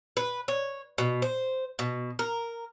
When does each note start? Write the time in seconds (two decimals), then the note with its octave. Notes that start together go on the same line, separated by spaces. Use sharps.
0.17 B4
0.48 C#5
0.98 B2
1.22 C5
1.79 B2
2.19 A#4